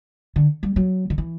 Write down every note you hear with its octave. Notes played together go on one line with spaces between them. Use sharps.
D3
G3
F#3
D3
E3